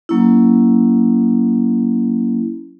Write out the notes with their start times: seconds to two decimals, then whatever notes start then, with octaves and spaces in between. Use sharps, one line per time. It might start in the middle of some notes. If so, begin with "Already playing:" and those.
0.09 F#3 A#3 C#4 E4